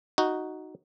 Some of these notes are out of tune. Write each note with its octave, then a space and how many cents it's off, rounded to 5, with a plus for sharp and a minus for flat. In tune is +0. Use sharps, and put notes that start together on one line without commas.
D#4 +0 F#4 +0